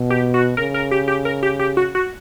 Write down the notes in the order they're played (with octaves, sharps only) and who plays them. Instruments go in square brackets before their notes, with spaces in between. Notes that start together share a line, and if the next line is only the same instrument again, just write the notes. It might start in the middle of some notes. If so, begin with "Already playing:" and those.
Already playing: [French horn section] B2
[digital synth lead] G4
F#4
[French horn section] C#3 [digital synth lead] A#4
[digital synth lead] A#4
G4
G4
A#4
G4
G4
F#4
F#4